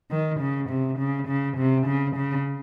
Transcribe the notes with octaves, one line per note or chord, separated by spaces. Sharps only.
D#3
C#3
C3
C#3
C#3
C3
C#3
C#3